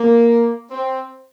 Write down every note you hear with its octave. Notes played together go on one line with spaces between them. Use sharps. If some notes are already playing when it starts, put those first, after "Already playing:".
Already playing: A#3
C4